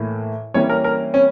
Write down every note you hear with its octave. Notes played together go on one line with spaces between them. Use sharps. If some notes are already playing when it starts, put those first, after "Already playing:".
Already playing: A2 E3 A#3
E3 G3 A#3 C#4 C#5
A#4
A#4
C#4